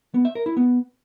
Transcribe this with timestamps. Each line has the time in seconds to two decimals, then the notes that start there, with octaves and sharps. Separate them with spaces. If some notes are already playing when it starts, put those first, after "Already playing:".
0.14 B3
0.25 E5
0.35 A#4
0.46 E4
0.57 B3